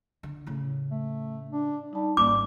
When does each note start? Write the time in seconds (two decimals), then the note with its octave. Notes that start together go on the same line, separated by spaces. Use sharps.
0.23 D3
0.47 A2 C#3
0.91 A3
1.51 D4
1.93 G3 D#4 A5
2.17 G#1 G3 A#3 C#4 D6